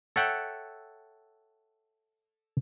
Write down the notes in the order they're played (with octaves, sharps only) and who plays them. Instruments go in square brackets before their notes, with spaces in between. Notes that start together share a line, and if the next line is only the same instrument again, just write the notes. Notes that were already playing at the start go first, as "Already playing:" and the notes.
[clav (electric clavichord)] A4 C#5 E5 F#5 G5